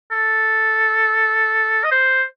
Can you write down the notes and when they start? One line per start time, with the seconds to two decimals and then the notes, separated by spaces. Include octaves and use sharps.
0.11 A4
1.84 D#5
1.91 C5